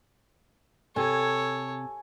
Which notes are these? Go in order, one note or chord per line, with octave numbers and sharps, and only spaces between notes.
C3 A4 C#5 G#5